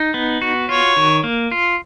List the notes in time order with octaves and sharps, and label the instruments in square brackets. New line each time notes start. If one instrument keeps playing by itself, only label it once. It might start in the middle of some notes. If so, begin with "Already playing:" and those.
Already playing: [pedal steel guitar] D#4
B3
F#4
[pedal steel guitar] F4 [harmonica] C#5
[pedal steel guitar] D#3
A#3
F4